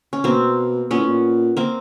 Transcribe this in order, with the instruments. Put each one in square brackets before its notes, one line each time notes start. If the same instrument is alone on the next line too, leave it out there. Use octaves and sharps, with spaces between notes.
[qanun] C#4
[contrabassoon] B2 [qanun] A#3 C4
[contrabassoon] A#2 [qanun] B3 C#4
[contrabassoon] A2
A#2
[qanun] A#3 C4